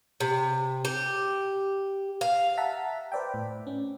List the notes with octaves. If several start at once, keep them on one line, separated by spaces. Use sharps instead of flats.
C3
G4
F5
E5 F#5 A5 A#5 B6
B4 C5 D5 E5 G5
A2
C#4